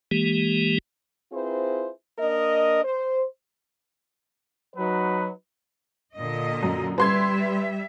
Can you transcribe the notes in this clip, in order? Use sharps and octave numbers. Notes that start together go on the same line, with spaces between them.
E3 G#3 A#3 G4
C4 E4 F4 G#4 B4 C5
A#3 D4 A#4 D#5
C5
F#3 D#4 F#4 B4
A#2 D3 D#5
F#2
G3 B4 E5 C6 G#6